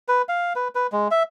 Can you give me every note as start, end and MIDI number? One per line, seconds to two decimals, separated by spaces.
0.08 0.22 71
0.29 0.53 77
0.56 0.68 71
0.75 0.87 71
0.92 1.08 56
1.11 1.23 76